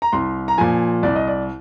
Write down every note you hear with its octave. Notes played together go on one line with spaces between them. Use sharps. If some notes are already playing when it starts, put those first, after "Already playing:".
A#5
C2 C6
A#5
A#2 F3 G#5
C2 D5
D#5
D5